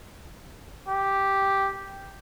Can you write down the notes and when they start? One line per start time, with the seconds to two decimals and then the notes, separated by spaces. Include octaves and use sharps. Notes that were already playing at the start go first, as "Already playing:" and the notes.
0.88 G4